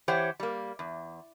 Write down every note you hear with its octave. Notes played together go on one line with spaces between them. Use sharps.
E3 G4 C5 C#5 F#5 G5
G3 A#3
E2